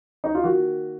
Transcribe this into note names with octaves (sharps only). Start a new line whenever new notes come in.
D#4
F4
D#3 A#3 F#4